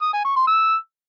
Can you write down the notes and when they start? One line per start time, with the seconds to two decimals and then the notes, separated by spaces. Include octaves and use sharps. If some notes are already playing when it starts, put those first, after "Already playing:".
0.02 D#6
0.13 G#5
0.25 C#6
0.36 C6
0.47 E6